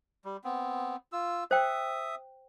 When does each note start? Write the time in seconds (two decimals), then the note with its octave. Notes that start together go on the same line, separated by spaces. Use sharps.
0.25 G3
0.44 B3 C4
1.12 F4 E6
1.51 C5 E5 G5 D#6